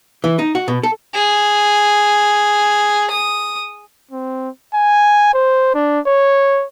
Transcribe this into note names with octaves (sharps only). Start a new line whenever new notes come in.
E3
D#4
F#4
B2
A4
G#4
D#6
C4
G#5
C5
D4
C#5